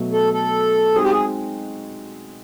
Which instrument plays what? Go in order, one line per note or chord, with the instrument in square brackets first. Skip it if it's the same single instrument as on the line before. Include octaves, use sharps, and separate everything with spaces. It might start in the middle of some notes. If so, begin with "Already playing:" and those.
Already playing: [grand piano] B2 F#3 A3
[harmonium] A4
A4
[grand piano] G#3 C4 D#4 F#4 [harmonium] G#4
[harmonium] G4
G#4